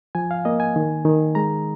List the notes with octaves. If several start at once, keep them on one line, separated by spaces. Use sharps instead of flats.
F3 G#5
F5
A#3 D#5
G#5
D#3
D#3
G#3 A#5